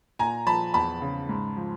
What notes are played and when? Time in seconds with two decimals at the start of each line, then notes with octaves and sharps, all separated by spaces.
0.19 A#2 G#5 A#5
0.46 F3 A5 B5
0.74 E2 A5 B5
1.02 C#3
1.29 G#2
1.56 F3